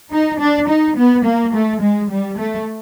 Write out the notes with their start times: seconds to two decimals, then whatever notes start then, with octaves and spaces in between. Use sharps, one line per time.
0.12 D#4
0.40 D4
0.68 D#4
0.96 B3
1.25 A#3
1.53 A3
1.81 G#3
2.10 G3
2.38 A3